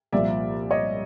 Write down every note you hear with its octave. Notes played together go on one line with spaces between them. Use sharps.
C2 A#2 F3 D5 E5
C#5 D#5